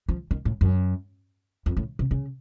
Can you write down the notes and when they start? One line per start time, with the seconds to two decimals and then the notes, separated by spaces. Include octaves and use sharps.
0.09 F3
0.31 D#3
0.45 A2
0.61 F#2
1.66 F2
1.77 A2
1.99 C3
2.11 C#3